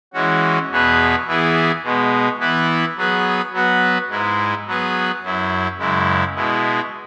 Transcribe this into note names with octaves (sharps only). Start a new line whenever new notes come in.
E3 G#3 C#4 F#4
E2 B2 B3 G#4 B4
E3 B3 E4 G#4
B2 G#3 B3
E3 B3 E4 B4
F#3 B3 G#4 B4
F#3 B3 F#4 B4
G#2 G#3 E4
F#3 B3 G#4 B4
F#2 F#3 E4
F#2 C#3 G#3 E4
B2 G#3 E4